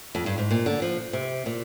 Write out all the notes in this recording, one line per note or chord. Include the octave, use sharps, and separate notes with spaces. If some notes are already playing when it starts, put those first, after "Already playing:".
F2
G2
G#2
A#2
D3
F3
C3
A#2